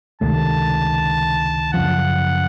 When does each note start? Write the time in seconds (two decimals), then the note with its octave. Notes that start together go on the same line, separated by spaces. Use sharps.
0.21 C#2 C3 D#3 A3 A5
1.73 F#2 C#3 F3 F#5